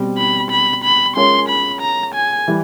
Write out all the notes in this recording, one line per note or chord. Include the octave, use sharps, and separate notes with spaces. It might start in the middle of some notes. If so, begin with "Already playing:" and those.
Already playing: B2 G3 C4
B5
B5
B5
G#3 C#4 F4 A#4 C#5 C6
B5
A#5
G#5
E3 G3